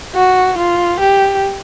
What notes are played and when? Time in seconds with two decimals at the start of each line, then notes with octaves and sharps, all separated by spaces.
0.15 F#4
0.58 F4
1.00 G4